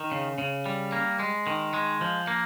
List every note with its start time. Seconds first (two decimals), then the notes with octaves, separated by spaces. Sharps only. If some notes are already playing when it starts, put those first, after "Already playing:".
Already playing: D#3
0.12 C#3
0.38 C#3
0.66 G3
0.92 A#3
1.19 G#3
1.47 D#3
1.74 G#3
2.01 F3
2.27 A#3